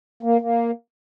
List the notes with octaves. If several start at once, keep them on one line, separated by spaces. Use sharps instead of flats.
A#3
A#3